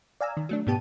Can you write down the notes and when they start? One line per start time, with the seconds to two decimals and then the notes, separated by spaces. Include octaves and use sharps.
0.21 D5 F5 G#5 A#5 E6
0.37 D#3
0.49 F#3 A3 D4
0.67 G#2 B2 B3 G4 A5 D#7